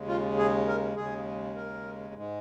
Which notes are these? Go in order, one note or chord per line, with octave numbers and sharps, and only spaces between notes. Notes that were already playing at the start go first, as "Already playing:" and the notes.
Already playing: D#2 C#3 G#3
F4
G#4
A#4
D#2 C#3 G#3 G#4
A#4
G#2 G#3